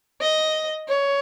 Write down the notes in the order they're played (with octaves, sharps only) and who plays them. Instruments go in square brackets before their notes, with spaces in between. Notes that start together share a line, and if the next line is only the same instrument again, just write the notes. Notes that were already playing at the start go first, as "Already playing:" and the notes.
[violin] D#5
C#5